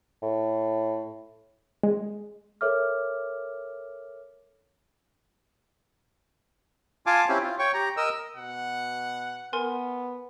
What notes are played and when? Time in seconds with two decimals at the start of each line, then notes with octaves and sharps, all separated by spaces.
0.22 A2
1.83 G#3
2.61 A4 A#4 C#5 E5 D6 F6
7.06 F4 F5 G#5 A5 D6
7.29 C4 C#4 E4 G4
7.43 F4
7.59 C#5 G5 C#6
7.74 G4 A#5
7.97 A#4 D#5 E6
8.36 B2 F#5
9.53 B3 A#4 G#5 C6